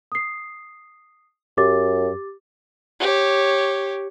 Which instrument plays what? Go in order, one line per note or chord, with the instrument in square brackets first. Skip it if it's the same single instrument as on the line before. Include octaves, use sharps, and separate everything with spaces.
[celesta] D#6 C7
[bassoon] F#2 [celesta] G4 D6 A6
[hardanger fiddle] G4 C#5